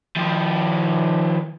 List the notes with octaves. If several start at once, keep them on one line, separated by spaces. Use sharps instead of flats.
D#3 F3